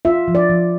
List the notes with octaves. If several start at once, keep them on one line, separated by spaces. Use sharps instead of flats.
F4 E5
F3
D5
F3